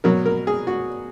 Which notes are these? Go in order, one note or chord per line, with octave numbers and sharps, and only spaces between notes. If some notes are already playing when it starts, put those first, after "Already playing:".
B2 F#3 A#4
A#4
G#4
F#4